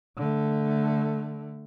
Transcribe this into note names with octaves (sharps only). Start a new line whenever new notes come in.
D3 A3